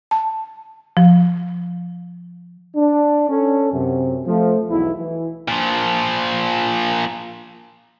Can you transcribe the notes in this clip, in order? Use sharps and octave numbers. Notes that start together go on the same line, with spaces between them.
A5
F3
D4
C#4 A4
F#2 C3
F3 A3
B1 E2 E4
E3
A#2 F3